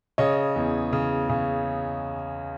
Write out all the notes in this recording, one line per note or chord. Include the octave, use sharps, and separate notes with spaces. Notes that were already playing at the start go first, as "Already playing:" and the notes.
C#3 C#5 D#5
E2
C#3
C#3